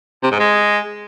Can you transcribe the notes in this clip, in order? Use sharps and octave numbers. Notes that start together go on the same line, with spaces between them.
C3
G#2
G#3